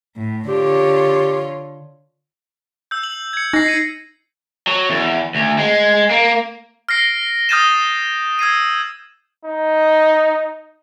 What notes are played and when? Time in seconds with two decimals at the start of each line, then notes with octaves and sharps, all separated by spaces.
0.18 A2
0.48 D3 F4 G4 C#5
2.91 E6 G6
3.03 F#7
3.33 G#6 C#7
3.53 D#4 A#6 C7
3.66 C7 D#7
4.67 F#3
4.90 E2
5.35 D2
5.59 G#3
6.10 A#3
6.89 F6 A#6 C7 D7
7.49 D#6 F6 G6 A6 D#7 E7
8.39 E6 G#6 C7 D#7
9.45 D#4